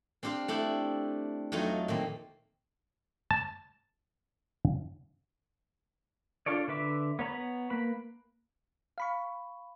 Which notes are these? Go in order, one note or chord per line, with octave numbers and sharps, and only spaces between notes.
C4 D4 G4 C5 F5
A3 D4 E4 G4
F2 F#3 A3 D#4 F4
A#2 D#3 C4
A5
D4 F4 A4 C#5 D5
D3 B4 E5 D6
B3 C#5 A#5 B5
A#3 B4 B5
F5 B5 C#6